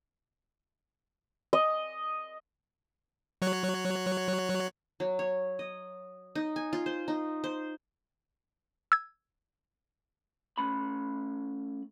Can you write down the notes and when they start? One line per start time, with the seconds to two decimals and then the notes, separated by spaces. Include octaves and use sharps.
1.53 D#5
3.42 F#3 C#5 F#6
5.00 F#3
5.19 C#5
5.59 D#5
6.35 D#4
6.56 G#5
6.73 F4
6.86 C5
7.08 D#4
7.44 C5
8.92 E6 G#6
10.58 A3 C#4 B5